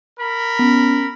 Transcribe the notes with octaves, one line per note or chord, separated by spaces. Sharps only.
A#4 B5
B3 C#4